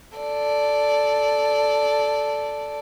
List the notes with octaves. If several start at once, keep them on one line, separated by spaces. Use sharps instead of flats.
A4 D5